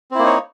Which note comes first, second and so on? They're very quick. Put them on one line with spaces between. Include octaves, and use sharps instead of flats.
C4 E4 A#3 D#4 C#5